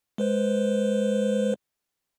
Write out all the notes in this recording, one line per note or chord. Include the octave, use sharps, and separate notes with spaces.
G#3 B4 C5